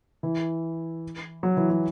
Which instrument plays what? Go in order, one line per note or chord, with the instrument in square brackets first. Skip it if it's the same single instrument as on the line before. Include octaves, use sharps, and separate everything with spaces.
[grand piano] E3
F#3
E3
F#3